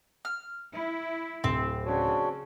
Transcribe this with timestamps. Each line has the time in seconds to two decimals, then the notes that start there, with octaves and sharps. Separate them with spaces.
0.25 F6
0.74 E4
1.44 D1 C4
1.85 C#3 D4 F#4 C#5